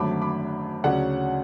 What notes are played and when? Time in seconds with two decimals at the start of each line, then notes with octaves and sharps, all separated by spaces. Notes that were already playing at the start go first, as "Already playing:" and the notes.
Already playing: G#1 F#2 D3 F#3 A3 B5 D6
0.22 B5 D6
0.84 D2 C#3 F#3 C#4 D5 F#5